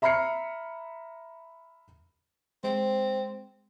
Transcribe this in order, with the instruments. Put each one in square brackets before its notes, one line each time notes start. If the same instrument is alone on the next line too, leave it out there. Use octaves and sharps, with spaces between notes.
[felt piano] E5 A#5 B5 F6 C7 C#7
[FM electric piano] G#3 [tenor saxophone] C4